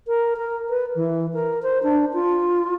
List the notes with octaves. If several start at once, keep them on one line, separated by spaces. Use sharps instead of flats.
A#4
A#4
B4
E3
A#4
C5
D4
F4